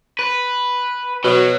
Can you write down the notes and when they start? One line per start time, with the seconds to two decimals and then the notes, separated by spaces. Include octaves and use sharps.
0.19 B4
1.24 B2 F#3